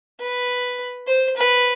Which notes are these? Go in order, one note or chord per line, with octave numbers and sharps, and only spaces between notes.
B4
C5
B4